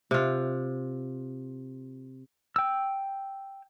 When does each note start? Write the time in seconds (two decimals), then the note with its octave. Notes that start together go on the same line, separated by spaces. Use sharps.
0.11 C3 F4
2.56 G5 E6